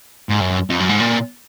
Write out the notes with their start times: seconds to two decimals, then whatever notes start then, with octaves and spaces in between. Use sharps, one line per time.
0.29 G#2
0.40 F#2
0.70 F2
0.80 F#2
0.90 G#2
1.00 A#2